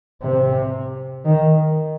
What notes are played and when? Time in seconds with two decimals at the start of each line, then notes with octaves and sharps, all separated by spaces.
0.22 C3
1.25 D#3